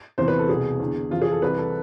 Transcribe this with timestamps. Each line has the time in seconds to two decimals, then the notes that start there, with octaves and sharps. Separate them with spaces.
0.18 E2 C3 E3 C5
0.28 B4
0.39 A4
0.48 C2 B2 G#4
0.80 E2 D3
1.11 F2 C3 E3 F4
1.22 G#4
1.32 A4
1.42 C2 C3 E3 B4
1.58 A4